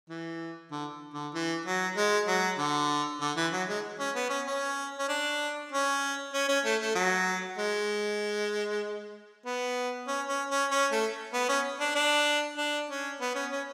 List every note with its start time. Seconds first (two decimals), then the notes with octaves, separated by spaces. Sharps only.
0.10 E3
0.71 D3
1.14 D3
1.34 E3
1.66 F#3
1.97 G#3
2.28 F#3
2.58 D3
3.21 D3
3.37 E3
3.53 F#3
3.69 G#3
3.99 C#4
4.15 B3
4.30 C#4
4.47 C#4
4.99 C#4
5.09 D4
5.72 C#4
6.34 C#4
6.49 C#4
6.65 A3
6.81 A3
6.95 F#3
7.58 G#3
9.46 B3
10.08 C#4
10.29 C#4
10.50 C#4
10.71 C#4
10.92 A3
11.34 B3
11.49 C#4
11.80 D4
11.95 D4
12.57 D4
12.90 C#4
13.21 B3
13.35 C#4
13.52 C#4